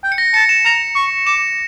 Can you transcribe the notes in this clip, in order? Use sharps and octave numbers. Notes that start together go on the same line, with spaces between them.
G5
C#7
A#6
A5 C#7
E7
A#5
C#6
D6 E7